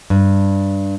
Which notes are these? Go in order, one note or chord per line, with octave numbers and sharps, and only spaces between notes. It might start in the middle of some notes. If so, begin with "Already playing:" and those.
G2